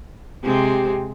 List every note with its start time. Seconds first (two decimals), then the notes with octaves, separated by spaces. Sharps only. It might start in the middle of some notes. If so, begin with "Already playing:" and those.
0.44 C3 G#3 C4 G4